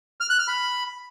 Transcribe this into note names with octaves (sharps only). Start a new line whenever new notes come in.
F6
F#6
F6
B5